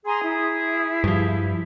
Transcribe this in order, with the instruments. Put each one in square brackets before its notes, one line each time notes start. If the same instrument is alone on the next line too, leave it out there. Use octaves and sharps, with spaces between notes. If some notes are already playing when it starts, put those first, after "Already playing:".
[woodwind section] G#4 [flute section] G#5 A#5 C6
[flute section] E4
[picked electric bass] G2 F3